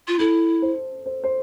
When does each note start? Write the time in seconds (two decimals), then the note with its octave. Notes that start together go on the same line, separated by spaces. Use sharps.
0.08 F4
0.19 E4 A4
0.62 C5
1.06 C5
1.24 C5